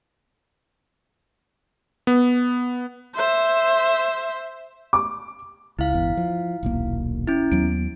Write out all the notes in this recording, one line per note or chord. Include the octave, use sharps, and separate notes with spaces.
B3
C5 E5
D6
C#2 E4 F5
G1 E2
F3
D#1 B1 A#3
C#4 E4
D#2 F#3 B3 D7